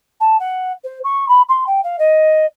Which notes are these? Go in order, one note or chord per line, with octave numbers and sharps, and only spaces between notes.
A5
F#5
C5
C#6
B5
C6
G5
F5
D#5